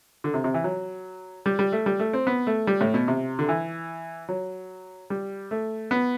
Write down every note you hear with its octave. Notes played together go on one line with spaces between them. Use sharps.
D3
C3
C3
E3
F#3
G3
G3
A3
G3
A3
C4
B3
A3
G3
A2
B2
C3
D3
E3
F#3
G3
A3
B3